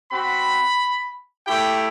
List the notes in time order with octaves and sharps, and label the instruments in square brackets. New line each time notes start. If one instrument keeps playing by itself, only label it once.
[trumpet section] C4 F#4 B5
A3 E4 G4 G5